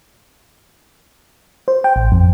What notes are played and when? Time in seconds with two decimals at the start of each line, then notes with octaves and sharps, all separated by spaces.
1.68 C5
1.84 G5
1.96 A1
2.12 F2